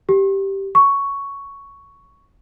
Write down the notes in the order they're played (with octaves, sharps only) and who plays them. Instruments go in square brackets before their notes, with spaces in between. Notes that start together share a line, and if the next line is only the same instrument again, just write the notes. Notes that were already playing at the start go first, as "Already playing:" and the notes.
[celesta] G4
C#6